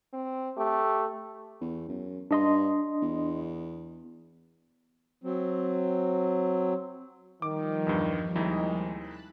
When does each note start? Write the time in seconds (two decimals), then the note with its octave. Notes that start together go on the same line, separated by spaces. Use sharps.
0.13 C4
0.58 A3 G4
1.61 E2
1.88 F#2
2.31 G2 D4 D#5 C6
3.02 E2
5.24 F#3 C4
7.42 D#3 F3 G3 D6
7.87 E2 G2
8.36 D#2 C3 D#3 G#3 D#4 E4
8.97 A5 B5 F#6